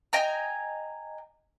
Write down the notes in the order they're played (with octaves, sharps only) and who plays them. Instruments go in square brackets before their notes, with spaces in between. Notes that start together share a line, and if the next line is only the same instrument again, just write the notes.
[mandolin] D#5 G5 G#5 A#5